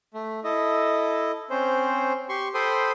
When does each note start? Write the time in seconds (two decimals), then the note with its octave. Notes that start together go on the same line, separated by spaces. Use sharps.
0.14 A3
0.44 E4 A4 D#5
1.50 C4 C#4 C5
2.29 G4 C6 C#6
2.54 A4 C5 G5 B5 C6 D#6